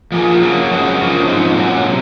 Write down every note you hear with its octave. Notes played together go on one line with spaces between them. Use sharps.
F3 A#3 F4 G#4
C#3 F#3 A#3
F#2 C#3 G#3 C4 F#4
C#3 F3 A#3
G#2 F3 C4 D#4
A#2 F#3 C#4
C3